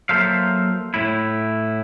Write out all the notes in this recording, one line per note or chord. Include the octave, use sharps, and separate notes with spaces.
F#3 A#3 A4 C5 E5 F5
A2 E4